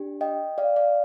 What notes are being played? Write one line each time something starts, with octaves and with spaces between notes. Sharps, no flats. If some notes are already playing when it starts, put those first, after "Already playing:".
Already playing: D4 G4
D#5 G5
D5 F5
D5 F5